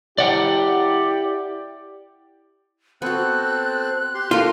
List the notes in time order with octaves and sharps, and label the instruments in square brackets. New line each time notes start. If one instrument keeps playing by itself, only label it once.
[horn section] E4 G4 [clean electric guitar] D5 F#5 G5
[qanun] B3 F#4 [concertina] C4 A4 C5 [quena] F#6
[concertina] G4 C6
[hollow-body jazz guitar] F4 [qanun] A4 A#4